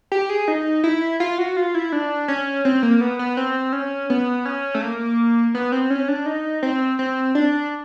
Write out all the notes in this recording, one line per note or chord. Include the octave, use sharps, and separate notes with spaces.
G4
G#4
D#4
E4
F4
F#4
F4
E4
D4
C#4
C4
A#3
B3
B3
C4
C#4
B3
C#4
A3
A#3
B3
C4
C#4
D4
D#4
C4
C4
D4